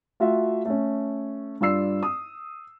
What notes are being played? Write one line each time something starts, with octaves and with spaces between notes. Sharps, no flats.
A3 F4 F#4 E5
A3 C#4
G2 F4 D5 E6 C7
D#6